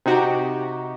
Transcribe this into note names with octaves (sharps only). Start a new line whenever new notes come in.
C3 D#4 F#4 G4